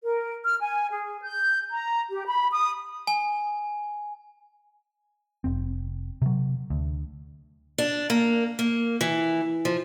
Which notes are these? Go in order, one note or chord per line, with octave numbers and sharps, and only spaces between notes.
A#4
F6
G#5
G#4
G6
A#5
G4
B5
D#6
G#5
F1 C4
C3 F#3
D2
D4
A#3
A#3
E3
F3